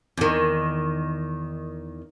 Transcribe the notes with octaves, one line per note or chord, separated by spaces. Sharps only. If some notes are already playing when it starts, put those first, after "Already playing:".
E2 D#3